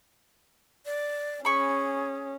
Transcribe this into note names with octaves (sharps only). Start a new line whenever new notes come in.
D5
C#4 G#4 B5 C#6